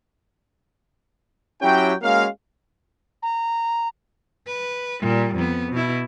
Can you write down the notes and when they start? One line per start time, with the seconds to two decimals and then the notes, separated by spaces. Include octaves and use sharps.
1.61 F#3 C#4 E4 G4 G5
2.02 G#3 A#3 C#4 F#4 F5
3.23 A#5
4.47 B4
5.01 A#2 G3
5.35 F2 B3
5.72 B2 E4